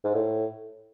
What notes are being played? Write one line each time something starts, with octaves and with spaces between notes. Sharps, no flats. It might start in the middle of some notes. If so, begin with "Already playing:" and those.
G#2
A2